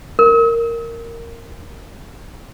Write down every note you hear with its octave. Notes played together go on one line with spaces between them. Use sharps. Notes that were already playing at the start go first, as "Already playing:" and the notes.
A#4